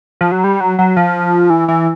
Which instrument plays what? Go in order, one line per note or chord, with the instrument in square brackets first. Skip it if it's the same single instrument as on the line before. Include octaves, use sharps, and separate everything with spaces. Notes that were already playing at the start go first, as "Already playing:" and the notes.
[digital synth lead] F3
F#3
G3
F#3
F#3
F3
E3
E3